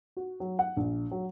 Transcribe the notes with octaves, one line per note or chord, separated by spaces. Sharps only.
F#4
F#3
F#5
A#1
F#3